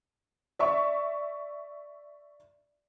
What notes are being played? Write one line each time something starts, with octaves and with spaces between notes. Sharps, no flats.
D5 E5 C#6